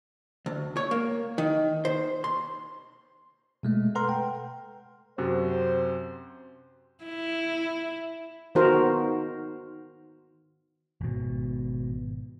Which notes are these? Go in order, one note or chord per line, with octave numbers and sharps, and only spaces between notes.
D2
C#5
A#3
D#3
C5
C6
B2 G#3 A3
A4 B4 F#5 A#5 C6 F6
G5
F#2 C3 F#4 C5
E4
D#3 B3 D#4 F#4 A#4 C5
G#1 B2